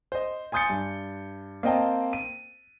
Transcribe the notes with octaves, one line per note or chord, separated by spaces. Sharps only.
C5 D#5
G#5 C6 D#6 G6 A6 C#7
G2
A#3 C4 D#5 G5 A5
D#7